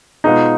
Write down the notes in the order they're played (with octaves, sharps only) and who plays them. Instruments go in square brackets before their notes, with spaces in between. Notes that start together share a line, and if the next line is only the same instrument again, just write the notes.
[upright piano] B2 G#3 B3 F4 [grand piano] D#4